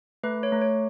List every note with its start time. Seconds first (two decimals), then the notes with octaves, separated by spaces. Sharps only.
0.23 A3 B4
0.43 C#5
0.52 A3
0.61 C#5